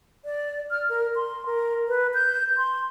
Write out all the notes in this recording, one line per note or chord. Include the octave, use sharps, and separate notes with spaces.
D5
F6
A#4
C6
A#4
B4
G6
C6